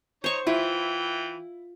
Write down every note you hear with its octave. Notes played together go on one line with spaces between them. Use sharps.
D#4 C5 C#5 C#6
E3 E4 F4 G5